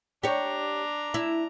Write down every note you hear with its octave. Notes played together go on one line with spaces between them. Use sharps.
D4 G4 C#5 A#5
E4